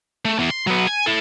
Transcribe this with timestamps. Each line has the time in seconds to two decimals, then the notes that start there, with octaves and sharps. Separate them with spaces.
0.25 A3
0.39 E2
0.50 C6
0.67 F#3 B3
0.87 G#5
1.06 E4 A4